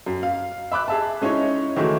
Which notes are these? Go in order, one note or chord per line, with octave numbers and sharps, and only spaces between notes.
F#2
F5
E5 B5 D6 F#6
G#4 E5 A5
G#3 C#4 D#4 E4 C#5
D#3 E3 F#3 G#3 A3